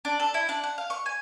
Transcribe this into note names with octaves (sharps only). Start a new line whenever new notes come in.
D4
A4
E4
D4
F#5
F5
C#6
G#5